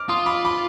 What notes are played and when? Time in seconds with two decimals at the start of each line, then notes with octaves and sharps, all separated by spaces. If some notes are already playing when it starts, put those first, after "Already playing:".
Already playing: D6 F6
0.09 F4 C6 D#6
0.26 B5 D6
0.45 B5 D6